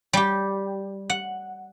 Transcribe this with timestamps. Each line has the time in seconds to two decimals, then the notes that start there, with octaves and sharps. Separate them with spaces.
0.13 G3 G4
1.10 F#5